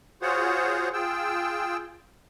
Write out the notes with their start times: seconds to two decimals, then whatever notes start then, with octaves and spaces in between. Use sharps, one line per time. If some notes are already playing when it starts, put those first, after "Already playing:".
0.22 F4 F#4 G#4 C5 C#5 F#5
0.93 F4 G#4 G5 E6